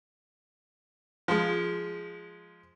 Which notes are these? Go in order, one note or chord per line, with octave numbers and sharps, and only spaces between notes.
F3 G#3